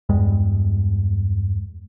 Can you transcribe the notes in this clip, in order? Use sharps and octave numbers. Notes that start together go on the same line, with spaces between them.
E2 G2 G#3